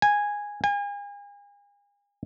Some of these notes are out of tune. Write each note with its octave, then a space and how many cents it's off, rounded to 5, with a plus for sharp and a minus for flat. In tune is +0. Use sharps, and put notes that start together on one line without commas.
G#5 -10
G#5 -40